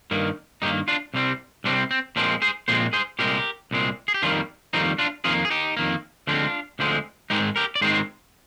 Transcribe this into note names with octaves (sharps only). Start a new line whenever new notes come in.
G2 D#3 A#3
G2 D#3 A#3 D#4 G4
D4 F4
C2 C3 G3 C4
C2 C3 G3 C4 D4
C4
A#2 F3 G#3 C4 D4
G#4 C5
A#2 F3 G#3 C4 G#4 C5
G#4 C5
C2 A#2 G#3 C4 G4 A#4
C2 A#2 G#3 C4
G#4
G4
F2 D#3 G3 A#3 D4 F4
F2 D#3 G3 A#3 C4 D#4
D4 F4
F2 D#3 A#3 F4 G#4
G#4
D#4 G4
F2 D#3 A#3
D2 D3 F3 G#3 C4 D4 F4
D2 D3 F3 G#3 C4
G#2 D#3 G#3 C4 D#4 G4
G4 A#4
D5
G#2 D#3 G#3 C4 G#4 C5